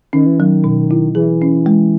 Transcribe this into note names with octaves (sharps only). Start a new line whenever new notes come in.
D#3 C#4
E3
D#3 F#3
B2
E4
E3 G#4
C#4
G#3